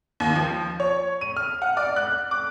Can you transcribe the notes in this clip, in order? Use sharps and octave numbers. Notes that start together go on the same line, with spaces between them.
D#2
F3
C#5
D#7
F6
F#5
D5
F#6
D6